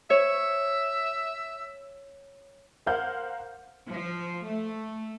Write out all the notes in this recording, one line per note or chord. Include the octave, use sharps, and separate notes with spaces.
C#5 E5
A#4 C5 F5 F#5 G6
F3
A3